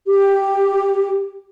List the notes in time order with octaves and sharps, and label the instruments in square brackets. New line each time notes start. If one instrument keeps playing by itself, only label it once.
[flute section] G4